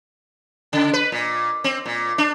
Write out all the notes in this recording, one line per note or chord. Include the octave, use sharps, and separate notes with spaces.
C#3
B4
A#2
C4
A#2
D4